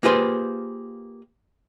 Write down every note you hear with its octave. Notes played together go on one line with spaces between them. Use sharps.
A#3 F4 G4 G#4 B4 C5